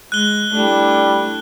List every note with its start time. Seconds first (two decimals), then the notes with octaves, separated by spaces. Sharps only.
0.12 G#3 F#6 G7
0.53 G3 A3 D4 E4